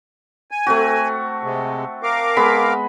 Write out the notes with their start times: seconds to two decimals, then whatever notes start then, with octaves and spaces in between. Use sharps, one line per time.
0.51 G#5
0.67 A3 C4 F#4
1.43 C3 G#3
2.03 A#4 F5 D6
2.37 G#3 B3 B5